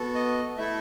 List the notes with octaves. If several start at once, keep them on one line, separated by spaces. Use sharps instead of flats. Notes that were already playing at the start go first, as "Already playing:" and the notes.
Already playing: B3 F#4 A4
D#5
A3 E4 A4 E5